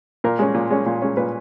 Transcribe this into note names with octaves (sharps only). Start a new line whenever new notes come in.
A#2 A#4
G#3 C#4
A#2
G#3 C#4
A#2
G#3 C#4
A#2 B4